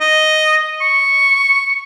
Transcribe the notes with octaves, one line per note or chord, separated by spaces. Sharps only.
D#5
C#6